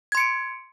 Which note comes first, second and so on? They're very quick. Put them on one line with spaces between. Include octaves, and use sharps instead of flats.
G#6 C6 C#7 D7